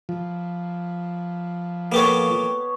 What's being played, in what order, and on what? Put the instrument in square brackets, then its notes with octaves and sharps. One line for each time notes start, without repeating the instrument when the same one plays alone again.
[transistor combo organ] F3
[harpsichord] A#3 G4 A4 [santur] B3 C#5